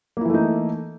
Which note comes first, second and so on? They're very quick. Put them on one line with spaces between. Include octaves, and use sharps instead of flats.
A#3 E4 E3 A3 D#4